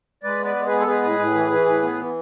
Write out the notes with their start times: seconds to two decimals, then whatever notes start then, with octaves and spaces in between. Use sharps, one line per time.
0.23 G#3 B4 D5
0.39 B3
0.44 B4 D5
0.56 G#3
0.66 G#4 B4
0.71 B3
0.80 A4
0.87 G#3 G#4 B4
1.02 A2
1.19 A2
1.34 E3
1.51 E3
1.66 A2
1.82 B3
1.97 E3